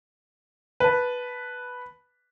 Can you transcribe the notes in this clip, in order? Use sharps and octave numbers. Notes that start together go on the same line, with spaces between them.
B4 A5